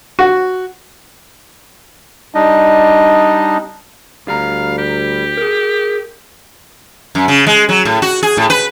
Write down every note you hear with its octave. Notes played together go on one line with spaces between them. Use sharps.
F#4
G3 D4 D#4 D#5
D2 G3 F5 A#5
G4
G#4 A#4
F#2
C#3
G#3
F#3
A2
F#4
G#4
A2
B4